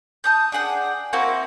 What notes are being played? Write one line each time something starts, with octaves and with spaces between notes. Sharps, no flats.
A5 D#6 G6
D4 G#4 F#5 G5
A#3 C4 E4 F#4